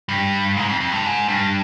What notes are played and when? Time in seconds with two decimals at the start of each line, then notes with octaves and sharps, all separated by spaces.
0.09 G2
0.57 G#2
0.69 F2
0.80 F2
0.92 G2
1.04 G#2
1.28 G2